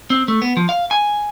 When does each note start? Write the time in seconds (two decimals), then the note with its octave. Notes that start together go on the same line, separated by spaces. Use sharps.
0.10 C4
0.28 A3
0.42 B3
0.57 F3
0.69 F5
0.91 G#5